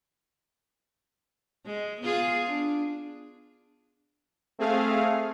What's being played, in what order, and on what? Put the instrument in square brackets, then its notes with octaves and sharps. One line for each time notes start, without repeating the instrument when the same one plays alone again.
[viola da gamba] G#3
B3 F4 G#4
D4
[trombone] A3 [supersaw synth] C4 G#4 F5